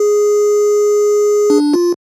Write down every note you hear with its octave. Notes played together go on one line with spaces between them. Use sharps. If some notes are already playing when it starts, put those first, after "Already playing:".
Already playing: G#4
D4
F4